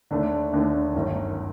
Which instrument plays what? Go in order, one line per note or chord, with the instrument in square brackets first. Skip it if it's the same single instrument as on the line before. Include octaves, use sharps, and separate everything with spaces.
[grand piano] D#2 D3 A3 D4
D#2 D3 A3 D4
G1 F#2 D#3